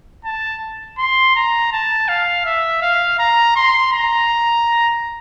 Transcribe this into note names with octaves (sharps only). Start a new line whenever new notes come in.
A5
C6
A#5
A5
F5
E5
F5
A#5
C6
A#5